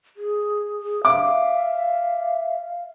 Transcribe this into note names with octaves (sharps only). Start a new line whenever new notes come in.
G#4
E5 F5 D6